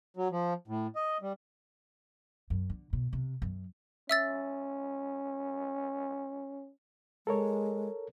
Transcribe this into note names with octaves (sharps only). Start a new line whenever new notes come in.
F#3
F3
A2
D#5
G3
F#2
D3
B2
C3
F#2
C#4 E5 E6 A6
G#3 A4 A#4 C#5